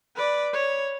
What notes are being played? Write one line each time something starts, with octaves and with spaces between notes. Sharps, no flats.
B4 D5
C#5